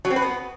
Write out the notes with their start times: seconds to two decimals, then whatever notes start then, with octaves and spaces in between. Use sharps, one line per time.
0.05 F#3
0.10 C4
0.16 B4
0.22 B3